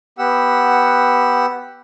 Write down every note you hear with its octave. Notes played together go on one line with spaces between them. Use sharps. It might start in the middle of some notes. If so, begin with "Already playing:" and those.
B3 G4 F#5 E6